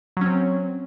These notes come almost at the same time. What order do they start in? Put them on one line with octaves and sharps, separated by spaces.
F#3 C#4 C4